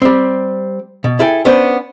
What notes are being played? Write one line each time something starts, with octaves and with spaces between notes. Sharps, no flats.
G3 C4
B2
E4 G#4 A4 G5
B3 C#4 D4 C5